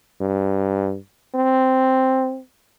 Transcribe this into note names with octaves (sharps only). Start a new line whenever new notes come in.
G2
C4